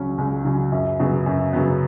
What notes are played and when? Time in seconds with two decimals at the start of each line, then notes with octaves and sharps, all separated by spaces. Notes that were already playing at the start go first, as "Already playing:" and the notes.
Already playing: C#2 C#3 F#3 C#4
0.18 C#2
0.45 C#3 F#3 C#4
0.72 F#2
0.99 C#3 F#3 B3
1.26 F#2
1.53 C#3 F#3 B3